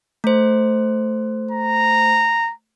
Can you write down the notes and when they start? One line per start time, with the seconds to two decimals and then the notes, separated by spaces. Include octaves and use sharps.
0.24 A3 C5
1.51 A#5